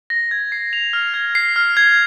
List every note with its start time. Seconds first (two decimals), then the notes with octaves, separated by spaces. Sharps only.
0.10 A#6
0.31 G#6
0.52 C7
0.73 F7
0.93 F6
1.14 G#6
1.35 C7
1.56 F6
1.77 G#6